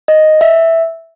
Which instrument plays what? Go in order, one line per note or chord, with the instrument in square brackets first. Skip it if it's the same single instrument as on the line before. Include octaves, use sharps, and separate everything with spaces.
[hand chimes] D#5
E5